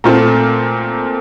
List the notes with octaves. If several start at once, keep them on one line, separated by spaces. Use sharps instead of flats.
A#2 A3 C4 F4